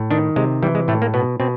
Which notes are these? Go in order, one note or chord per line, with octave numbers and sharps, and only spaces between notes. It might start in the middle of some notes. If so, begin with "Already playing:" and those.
Already playing: A2
D#3 D4
C3 G#3
E3 G3
G#3
A2 A3
A#3
B2 B3
B2 C4